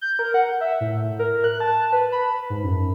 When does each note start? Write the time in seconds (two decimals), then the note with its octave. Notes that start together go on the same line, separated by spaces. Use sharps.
0.01 G6
0.19 A#4
0.34 F#5
0.61 E5
0.81 A2
1.19 A#4
1.44 F#6
1.60 A5
1.93 B4
2.12 B5
2.50 G#2
2.64 F#2